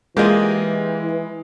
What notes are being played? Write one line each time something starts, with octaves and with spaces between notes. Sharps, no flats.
E3 G#3 A#3 F4 G4 G#4 D#5